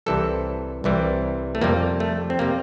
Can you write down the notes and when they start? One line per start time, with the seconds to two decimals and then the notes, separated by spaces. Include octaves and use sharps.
0.06 C2 C3 E3 G3 A4
0.84 C2 C3 E3 G3
1.55 A3
1.62 F2 C3 G3 A#3
2.00 A3
2.30 C4
2.39 C3 G3 A#3